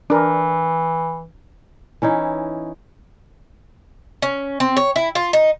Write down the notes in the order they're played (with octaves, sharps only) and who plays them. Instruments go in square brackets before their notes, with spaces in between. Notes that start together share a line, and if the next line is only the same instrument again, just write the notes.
[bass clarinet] E3 [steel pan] D4 A#4
[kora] E3 C#4 D#4 E4
[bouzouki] C#4
C4
C#5
E4
F4
D#4